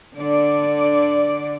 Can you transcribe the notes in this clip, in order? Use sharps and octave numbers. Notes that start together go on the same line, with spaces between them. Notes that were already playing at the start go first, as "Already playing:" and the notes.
D3 D5